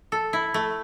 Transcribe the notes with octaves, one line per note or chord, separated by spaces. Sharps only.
A4
E4
A3